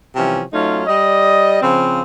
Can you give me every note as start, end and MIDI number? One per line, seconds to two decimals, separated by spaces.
0.15 0.42 48
0.15 0.42 52
0.15 0.42 53
0.15 0.42 55
0.15 0.42 61
0.53 0.82 54
0.53 0.82 57
0.53 0.82 61
0.53 0.82 63
0.53 0.82 65
0.87 1.61 55
0.87 1.61 74
0.87 1.61 75
1.62 2.02 49
1.62 2.02 53
1.62 2.02 60